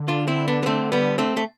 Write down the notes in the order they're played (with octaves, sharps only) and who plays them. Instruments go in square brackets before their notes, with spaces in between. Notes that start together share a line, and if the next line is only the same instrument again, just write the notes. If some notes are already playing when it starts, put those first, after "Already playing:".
Already playing: [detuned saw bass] D3
[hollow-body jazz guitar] D4 F4
C4 E4
B3 D4
B3
A3 C4
G3 B3
A3 C4
A3